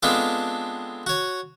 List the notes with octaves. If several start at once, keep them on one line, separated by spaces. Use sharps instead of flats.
G#3 B3 C4 D4 F4 A4
F#4 C#5